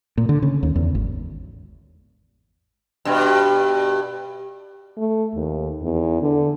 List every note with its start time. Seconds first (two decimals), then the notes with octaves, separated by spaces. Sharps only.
0.17 A#2
0.29 D3
0.42 C#3
0.63 D#2
0.76 E2
0.95 G#1
3.05 G2 B2
4.97 A3
5.35 D#2
5.82 E2
6.22 D3